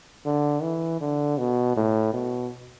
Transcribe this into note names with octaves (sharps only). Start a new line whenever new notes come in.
D3
E3
D3
B2
A2
B2